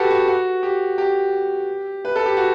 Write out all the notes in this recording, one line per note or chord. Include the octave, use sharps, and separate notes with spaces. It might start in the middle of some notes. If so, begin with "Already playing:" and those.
Already playing: F#4 G4 A4 B4
F#4
F#4
G4
G4
B4
A4
G4
F#4